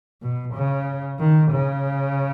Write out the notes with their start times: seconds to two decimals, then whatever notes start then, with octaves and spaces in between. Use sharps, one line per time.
0.22 B2
0.54 C#3
1.20 D#3
1.52 C#3